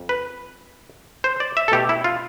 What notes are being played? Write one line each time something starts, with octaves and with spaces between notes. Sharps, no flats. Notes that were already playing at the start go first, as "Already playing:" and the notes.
Already playing: F2
B4
C5
D5
E5
A4
B2 A3 E4 G4
E4
F4